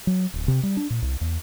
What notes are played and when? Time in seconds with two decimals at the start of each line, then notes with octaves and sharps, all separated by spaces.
0.07 F#3
0.34 D1
0.48 C3
0.63 G3
0.77 D4
0.90 A#2
1.02 C2
1.21 E2